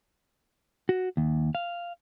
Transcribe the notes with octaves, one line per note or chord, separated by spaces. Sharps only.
F#4
D#2
F5